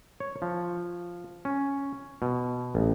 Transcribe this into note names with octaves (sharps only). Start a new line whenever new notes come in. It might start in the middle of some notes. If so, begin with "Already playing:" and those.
C#5
F3
C#4
B2
A1